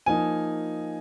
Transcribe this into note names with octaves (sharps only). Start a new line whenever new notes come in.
F3 A#3 D#4 G#5